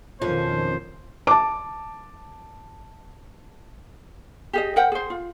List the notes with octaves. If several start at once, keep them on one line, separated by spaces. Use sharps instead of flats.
F2 B2 D#3 F3 C#4 F4 C5
A5 D6
G4 G#4 D#5
A#4 C5 F#5 G5
G#4 C5
F4